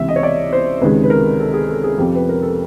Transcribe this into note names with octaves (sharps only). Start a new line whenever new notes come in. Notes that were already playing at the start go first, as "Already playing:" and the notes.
Already playing: C#2 C3 E3 E5
D#5
C#5
D5
C5
C#2 C3 D#3 G#3 B4
B4
A#4
A4
G#4
A4
G#4
F2 C3 F3 G4
B4
A#4
A4